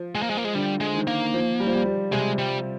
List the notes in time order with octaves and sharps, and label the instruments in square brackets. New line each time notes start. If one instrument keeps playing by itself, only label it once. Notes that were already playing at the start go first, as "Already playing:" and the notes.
Already playing: [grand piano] F3
[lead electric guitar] G#3
A#3
G#3
A#3
G#3
[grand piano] D3 [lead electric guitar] G3
[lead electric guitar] G#3
[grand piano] D#3
[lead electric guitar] A#3
[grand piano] F3
G3
F3
G3
G3
[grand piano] C3 [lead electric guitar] G#3
[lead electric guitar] G3